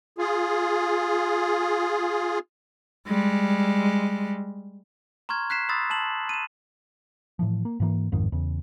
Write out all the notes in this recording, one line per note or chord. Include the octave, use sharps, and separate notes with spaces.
F4 G#4
G3 G#3
A#5 C6 C#6 F6 G#6
F#6 B6 C7 E7
B5 C6 D#6 E6 A6
A5 E7 F#7
D#7 E7
A2 E3 F3
A#3
G#2 E3 A#3
A1 F2 G#2 D#3
E2 C#3